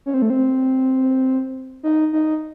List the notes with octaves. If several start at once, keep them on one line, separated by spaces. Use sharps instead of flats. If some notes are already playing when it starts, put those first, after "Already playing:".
C#4
C4
A3
C4
D#4
D#4